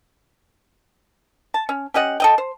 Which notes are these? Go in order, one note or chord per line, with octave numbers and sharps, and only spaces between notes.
A5
C#4
C#4 G4 D#5 F#5
A4 D#5 G5
C5